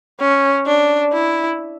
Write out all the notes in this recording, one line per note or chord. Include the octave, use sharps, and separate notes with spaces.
C#4
D4
E4